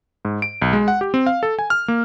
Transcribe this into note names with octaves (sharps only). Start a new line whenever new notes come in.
G#2
D7
B1
G#3
F#5
G4
C4
F5
A4
G#5
F6
A#3